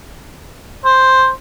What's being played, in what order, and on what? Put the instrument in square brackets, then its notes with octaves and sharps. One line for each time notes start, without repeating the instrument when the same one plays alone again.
[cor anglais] C5